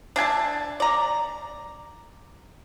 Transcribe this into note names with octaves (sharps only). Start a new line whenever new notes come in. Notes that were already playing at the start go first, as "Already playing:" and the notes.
D4 E5 G#5 A5
D5 A#5